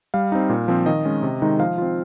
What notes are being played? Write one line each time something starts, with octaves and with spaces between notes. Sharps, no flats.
G3 F5
C4 D#4
A#2
F3 C4
D#3 D#5
G#3 C#4
C3
D#3 G#3 D#4
F3 F5
C4 F4